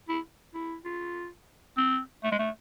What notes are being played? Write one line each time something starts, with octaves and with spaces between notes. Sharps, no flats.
E4
E4
F4
C4
A3
G#3
A3